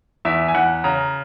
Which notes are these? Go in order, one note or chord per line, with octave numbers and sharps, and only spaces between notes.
E2 E5
G#5
E2 F#5
C#3 A#5